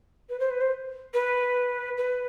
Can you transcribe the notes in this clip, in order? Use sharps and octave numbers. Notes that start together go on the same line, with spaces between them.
B4
C5
B4
C5
B4
B4